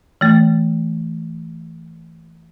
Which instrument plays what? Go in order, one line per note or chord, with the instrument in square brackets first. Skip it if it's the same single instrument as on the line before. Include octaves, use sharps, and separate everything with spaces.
[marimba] E3 A3